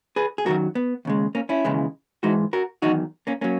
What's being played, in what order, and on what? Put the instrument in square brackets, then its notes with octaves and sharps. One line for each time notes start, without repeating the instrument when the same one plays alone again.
[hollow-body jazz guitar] G#4 B4
G#4
F#2 D#3 F#3 F#4 A#4
B3
D#2 C#3 G#3
A#3 C#4
C#4 E4
D#2 C#3 E3 G#3
G#2 E3 G#3 D#4 F#4
F#4 A#4
E2 D#3 F#3 D#4 F#4
A#3 C#4
F#3 A#3 C#4